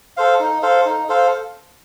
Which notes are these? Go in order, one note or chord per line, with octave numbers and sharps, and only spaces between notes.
A4 C5 F5
D#4
A4 C5 F5
D#4
A4 C5 F5